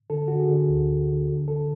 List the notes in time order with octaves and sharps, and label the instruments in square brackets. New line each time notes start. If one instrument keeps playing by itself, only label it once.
[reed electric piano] D3 A4
D3 F#4
G#4
D3
D2
D2
D3
D3
D3 A4